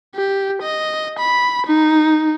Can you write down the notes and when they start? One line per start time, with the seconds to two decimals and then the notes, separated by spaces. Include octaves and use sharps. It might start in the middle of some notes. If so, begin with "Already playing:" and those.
0.15 G4
0.62 D#5
1.19 B5
1.66 D#4